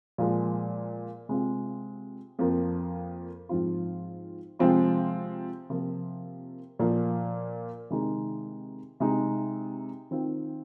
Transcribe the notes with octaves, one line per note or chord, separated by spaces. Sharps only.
A#2 F3 G#3
C3 G#3 C4 F4
F2 F3 A#3
G#2 F3 C4 F4
C3 F3 G#3 C4 F4
C3 F3 A#3 F4
A#2 F3 A#3
C3 D#3 G#3 D#4
C3 G#3 D#4
D#3 C4 F4